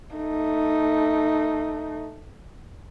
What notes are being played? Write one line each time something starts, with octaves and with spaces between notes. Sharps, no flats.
A3 D#4